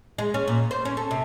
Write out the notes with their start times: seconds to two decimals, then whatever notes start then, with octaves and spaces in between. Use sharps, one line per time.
0.18 G#3
0.34 C#4
0.48 A#2
0.71 C5
0.85 C#4
0.97 A4
1.11 C3